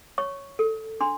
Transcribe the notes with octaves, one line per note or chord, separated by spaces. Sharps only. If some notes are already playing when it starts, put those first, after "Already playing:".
C#5 C#6
A4
D4 C6